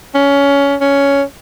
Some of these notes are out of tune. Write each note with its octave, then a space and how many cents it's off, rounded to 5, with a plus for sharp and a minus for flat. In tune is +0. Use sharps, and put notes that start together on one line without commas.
C#4 +20
C#4 +10